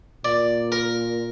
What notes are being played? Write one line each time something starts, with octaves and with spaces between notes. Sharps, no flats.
A#2 D5
A#4